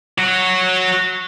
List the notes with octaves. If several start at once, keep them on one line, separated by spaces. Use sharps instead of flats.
F#3 F#4